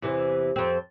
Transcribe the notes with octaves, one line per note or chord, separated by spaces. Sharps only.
E2 C3 E3
F2 C4